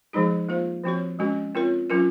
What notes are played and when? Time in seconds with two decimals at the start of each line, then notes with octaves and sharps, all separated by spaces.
0.13 F3 G#3 D#4 G#4
0.49 A#3 F4 C5
0.84 F3 C4 F#4 C#5
1.19 G#3 C#4 F#4
1.55 C4 F4 A#4 C#5
1.90 F#3 C#4 F4 A#4